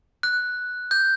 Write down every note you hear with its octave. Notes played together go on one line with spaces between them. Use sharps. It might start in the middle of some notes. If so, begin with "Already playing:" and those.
F#6
G6